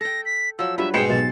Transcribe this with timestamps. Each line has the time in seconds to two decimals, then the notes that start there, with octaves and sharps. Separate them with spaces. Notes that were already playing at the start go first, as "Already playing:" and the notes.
0.01 A4 G5 A#6
0.25 B6
0.59 F3 F#3 E6
0.78 G2 F#3 F4 B4 E5
0.94 G#2 B2 C4 G#4 G5 C7 C#7 E7
1.10 B1 C5 A6